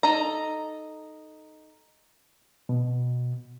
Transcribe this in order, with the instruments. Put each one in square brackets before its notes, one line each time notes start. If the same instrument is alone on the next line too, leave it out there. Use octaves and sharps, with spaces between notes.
[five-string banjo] D#4 A4 A#5
[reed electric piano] B2